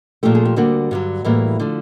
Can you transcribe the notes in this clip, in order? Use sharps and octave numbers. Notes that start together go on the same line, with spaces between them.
A#2 F3 A3 G4
G#4
G4
D2 D3 G3 A#3 F#4
G2 D3 F#3
A2 E3 G3 A#3
D3 F3 A3